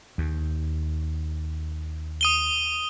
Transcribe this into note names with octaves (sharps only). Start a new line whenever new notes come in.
D#2
D#6 D#7 G7